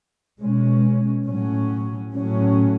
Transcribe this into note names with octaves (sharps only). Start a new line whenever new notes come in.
B2 G#3 C#4
A2 F#3 C#4
A2 F#3 C#4